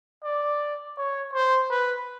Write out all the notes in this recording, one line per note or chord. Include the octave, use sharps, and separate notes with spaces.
D5
C#5
C5
B4